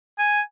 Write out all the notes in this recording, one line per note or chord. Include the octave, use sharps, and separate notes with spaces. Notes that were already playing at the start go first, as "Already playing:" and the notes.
G#5